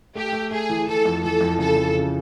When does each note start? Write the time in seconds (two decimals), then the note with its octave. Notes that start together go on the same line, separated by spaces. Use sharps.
0.15 A3 G4
0.33 A3
0.51 A3 G#4
0.69 E3
0.87 E3 A4
1.05 F2
1.23 E3 A4
1.41 F2
1.59 C#3 A4
1.77 F2
1.95 C#3